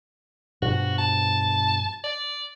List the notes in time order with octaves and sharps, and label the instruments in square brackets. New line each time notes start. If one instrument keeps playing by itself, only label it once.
[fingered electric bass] G2 B2 F3 [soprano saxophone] F#4
[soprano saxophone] A5
D5